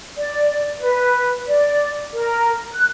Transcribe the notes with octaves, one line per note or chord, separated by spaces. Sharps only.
D5
B4
D5
A#4
F#6